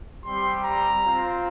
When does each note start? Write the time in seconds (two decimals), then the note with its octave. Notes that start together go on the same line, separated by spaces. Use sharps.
0.25 G3 C4 G4 C6
0.64 A#5
1.05 C4 F4